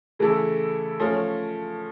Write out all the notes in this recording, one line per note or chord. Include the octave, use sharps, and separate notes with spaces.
C#3 E3 A3 E4 A4
F3 A3 C#4